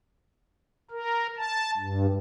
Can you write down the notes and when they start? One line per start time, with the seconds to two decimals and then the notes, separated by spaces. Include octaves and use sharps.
0.91 A#4
1.37 A5
1.78 G2